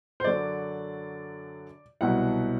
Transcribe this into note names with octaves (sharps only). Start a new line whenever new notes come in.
C5
F#2 D3 F#3 D5
C2 B2 F#3 F#5